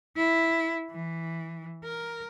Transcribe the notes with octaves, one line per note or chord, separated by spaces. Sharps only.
E4
E3
A#4